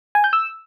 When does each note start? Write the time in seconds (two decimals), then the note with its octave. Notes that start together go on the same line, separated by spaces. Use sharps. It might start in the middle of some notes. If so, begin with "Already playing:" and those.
0.15 G#5
0.24 G6
0.33 E6